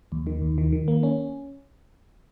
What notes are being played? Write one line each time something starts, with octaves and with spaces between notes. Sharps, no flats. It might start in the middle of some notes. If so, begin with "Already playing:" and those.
D#2
D#3
D#2
D#3
D#3
A#3
C#4